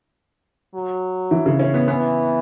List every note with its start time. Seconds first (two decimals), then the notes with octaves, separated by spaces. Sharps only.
0.75 F#3
1.31 E3
1.46 C#3
1.60 C#4
1.74 B3
1.88 E3 B3